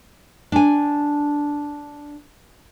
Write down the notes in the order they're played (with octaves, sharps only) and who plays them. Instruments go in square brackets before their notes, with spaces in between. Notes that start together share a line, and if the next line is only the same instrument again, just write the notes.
[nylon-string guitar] D4 G#5